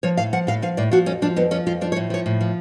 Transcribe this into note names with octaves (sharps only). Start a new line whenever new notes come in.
F3 C#5
A2 F5
F3 F#5
A2 F5
F3 F5
A2 D5
F3 F#4
F2 C#4
F3 D4
F2 B3
F3 C#4
F2 F4
F3 D4
C#5
A2
F3 C#5
A2
F3